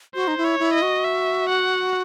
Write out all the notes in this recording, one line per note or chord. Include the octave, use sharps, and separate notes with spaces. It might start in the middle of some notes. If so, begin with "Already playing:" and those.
F#4 C5
D#4
E4
C#5
E4
D#5
F#4
E5
F#5